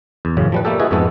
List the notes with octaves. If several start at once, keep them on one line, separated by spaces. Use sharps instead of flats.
E2
A1 F#2 C#3
F3 G3 B4
G3 A3 A#3 G4 A4
E4 F#4 G#4 B4 D#5
F2 G#2 G#3 B3 A4